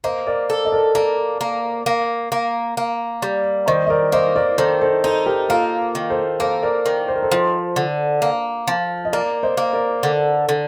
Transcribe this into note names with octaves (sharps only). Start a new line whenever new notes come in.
A#3 C5 D#5
A#4 D5
A4
D#5
A#4 D5
A#3 A#4 D5
A#3
A#3
A#3
A#3
G3
D#3 C5 D#5
D#5
A#4 D5
A#3 C5 D#5
A#4 D5
D#3 A4 C5
A4 C5
D#4 A4 C5
G4 A#4
A#3 F4 A4
D#3
A4 C5
A#3 A4 C5
A#4 D5
D#3
C5
A#4
A4 C5
F3
D3
A#3
F3
D#5
A#3 A#4 D5
C5 D#5
A#3
A#4 D5
D3
D3